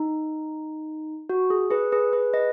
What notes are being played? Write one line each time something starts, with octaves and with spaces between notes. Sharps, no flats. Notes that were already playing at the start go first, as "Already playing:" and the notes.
Already playing: D#4
F#4
G#4
G#4 B4
G#4 B4
G#4 B4
B4 D#5